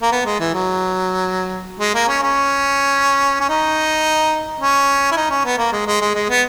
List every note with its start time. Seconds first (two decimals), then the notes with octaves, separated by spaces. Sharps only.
0.02 A#3
0.12 B3
0.26 G#3
0.40 E3
0.54 F#3
1.80 G#3
1.95 A#3
2.08 C#4
2.23 C#4
3.40 C#4
3.49 D#4
4.61 C#4
5.12 E4
5.17 D#4
5.30 C#4
5.45 B3
5.58 A#3
5.72 G#3
5.87 G#3
6.01 G#3
6.15 G#3
6.30 B3